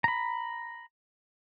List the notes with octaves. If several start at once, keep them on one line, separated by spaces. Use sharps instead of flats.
A#5 B5